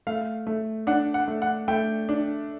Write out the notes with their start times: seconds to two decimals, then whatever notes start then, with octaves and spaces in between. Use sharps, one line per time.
0.07 A3 F5
0.47 A3
0.87 D4 F#5
1.14 F#5
1.28 A3
1.42 F#5
1.68 A3 G5
2.09 D4